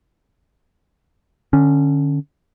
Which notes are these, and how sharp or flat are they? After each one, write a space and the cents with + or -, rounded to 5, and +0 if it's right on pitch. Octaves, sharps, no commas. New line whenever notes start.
D3 +20 C#4 +0